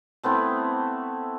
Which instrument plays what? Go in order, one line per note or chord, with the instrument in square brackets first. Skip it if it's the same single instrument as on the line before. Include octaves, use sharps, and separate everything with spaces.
[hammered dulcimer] A3 B3 C4 E4